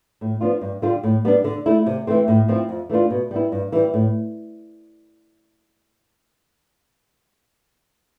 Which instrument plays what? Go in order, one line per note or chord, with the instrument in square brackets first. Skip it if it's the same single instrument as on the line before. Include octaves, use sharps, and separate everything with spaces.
[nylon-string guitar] A2
F3 B3 D4 F4
G2
D3 G3 D4 F4
A2
G3 B3 D4
D3
A3 E4
C3
E3 A3 C4
A2
F3 C4 E4
F2
E3 A3 D4 F4
B2
G3 B3 E4
G2
E3 G3
A2